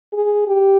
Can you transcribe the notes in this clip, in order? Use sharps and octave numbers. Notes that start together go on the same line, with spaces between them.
G#4
G4